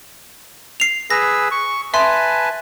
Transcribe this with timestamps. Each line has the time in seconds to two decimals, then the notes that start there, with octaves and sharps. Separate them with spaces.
0.80 C7 F7
1.10 G#4 B4 E6 A#6
1.51 C#6
1.94 B4 E5 G#5 A5 C6